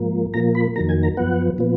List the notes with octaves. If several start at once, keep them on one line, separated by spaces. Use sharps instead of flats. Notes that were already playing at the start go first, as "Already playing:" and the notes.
Already playing: G#2 F3 A#3
A#2 F3 A#3 A#5
B5
F2 D#3 F#3 A#3 A#5
G#5
A#5
F#2 F3 B3 F#5
A#2 F3 B3